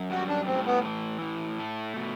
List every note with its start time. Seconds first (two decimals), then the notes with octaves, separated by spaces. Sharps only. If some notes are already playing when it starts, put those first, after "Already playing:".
Already playing: F#2
0.10 G3 F#4
0.28 D4
0.47 A2 C4
0.66 B3
0.85 E3
1.21 A2
1.60 A3
1.96 B2